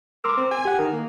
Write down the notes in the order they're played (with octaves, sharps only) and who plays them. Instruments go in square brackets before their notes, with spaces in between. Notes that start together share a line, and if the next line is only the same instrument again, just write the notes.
[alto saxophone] A#4 [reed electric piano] C6 D6 E6
[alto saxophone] C4
G#5
[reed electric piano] G4 F#5
[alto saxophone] D#3 [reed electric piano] A#4
[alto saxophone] A#3